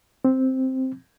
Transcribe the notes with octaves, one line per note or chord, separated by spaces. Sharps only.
C4